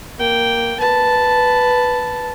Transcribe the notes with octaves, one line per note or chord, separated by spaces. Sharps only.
A#3 G5
B4 A5